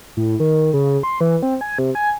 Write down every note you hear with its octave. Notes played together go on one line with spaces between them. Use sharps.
A2
D#3
C#3
C6
E3
C4
G#5
C3
G#5